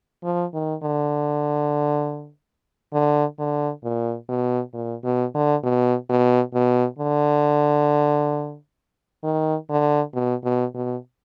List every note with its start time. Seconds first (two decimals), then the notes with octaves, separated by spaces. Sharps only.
0.24 F3
0.54 D#3
0.83 D3
2.93 D3
3.39 D3
3.84 A#2
4.29 B2
4.74 A#2
5.04 B2
5.35 D3
5.63 B2
6.09 B2
6.54 B2
6.99 D3
9.24 D#3
9.70 D3
10.14 B2
10.44 B2
10.75 B2